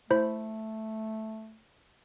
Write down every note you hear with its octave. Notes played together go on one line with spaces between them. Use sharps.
A3 E4 C5 B5